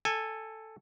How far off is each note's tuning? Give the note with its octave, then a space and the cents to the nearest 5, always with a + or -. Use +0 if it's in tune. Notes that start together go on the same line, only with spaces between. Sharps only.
A4 +5 G#5 -10